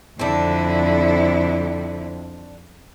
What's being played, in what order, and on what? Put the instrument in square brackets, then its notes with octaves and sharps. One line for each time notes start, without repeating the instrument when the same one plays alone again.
[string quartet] F2 [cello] D3 E4 [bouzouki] C4 D4